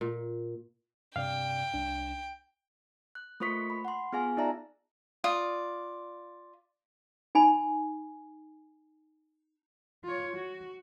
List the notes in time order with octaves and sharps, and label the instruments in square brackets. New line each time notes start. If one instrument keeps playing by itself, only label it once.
[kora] A#2
[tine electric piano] G2 C3 D5 [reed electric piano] F5 [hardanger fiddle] G5
[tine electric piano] C2 D4
[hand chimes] F#6
A3 A#3 F4 C5 C#6 B6
B5
F#5 C6
B3 F4 G#4 F5 G#5
D#4 F4 D5 E5 A5 A#5
[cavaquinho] F4 D5 D#6
[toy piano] D#4 G#5 B5
[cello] F4 C#5
F#4